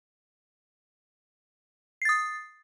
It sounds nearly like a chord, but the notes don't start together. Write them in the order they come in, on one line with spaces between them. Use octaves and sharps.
C7 A6 D#6